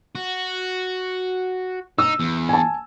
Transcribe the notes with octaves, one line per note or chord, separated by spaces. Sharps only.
F#4
D#4 E6
E2
G#5 A5